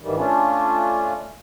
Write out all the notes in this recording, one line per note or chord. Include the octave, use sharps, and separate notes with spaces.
G#2 D#3 E3 G3
A3 C#4 D4 F4